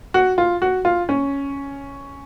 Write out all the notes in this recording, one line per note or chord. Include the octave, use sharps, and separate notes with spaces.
F#4
F4
F#4
F4
C#4